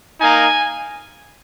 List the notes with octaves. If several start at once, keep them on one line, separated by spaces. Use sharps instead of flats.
A#3 D#4 G#5